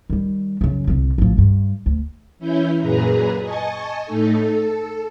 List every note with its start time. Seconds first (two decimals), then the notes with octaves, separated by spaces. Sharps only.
0.10 D#3 G3
0.61 F#2 C#3
0.87 C2 D3
1.18 A1 F3
1.38 G2
1.86 D2
2.39 E3 C#4 E4 G6
2.79 F#2 A#2 G#4 B4 A#5
3.41 D#5 G#5 A5 C#6
4.06 A2 A3 D#4 A4
4.41 A4